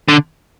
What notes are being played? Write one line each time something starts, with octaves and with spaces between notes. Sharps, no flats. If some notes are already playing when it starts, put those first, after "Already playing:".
D3